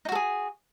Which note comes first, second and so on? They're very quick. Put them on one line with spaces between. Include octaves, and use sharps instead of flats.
D#4 F#4 A4 G#4